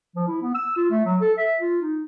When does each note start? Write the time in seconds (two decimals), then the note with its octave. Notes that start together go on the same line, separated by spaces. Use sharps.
0.16 F3
0.28 E4
0.42 B3
0.55 E6
0.76 F4
0.91 A3
1.05 F#3
1.21 A4
1.38 E5
1.60 F4
1.82 D#4